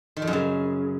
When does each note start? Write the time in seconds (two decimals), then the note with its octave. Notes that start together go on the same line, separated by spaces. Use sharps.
0.17 D#3
0.22 F2
0.27 F#2
0.33 C#3